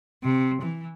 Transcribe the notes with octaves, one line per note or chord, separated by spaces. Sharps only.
C3
E3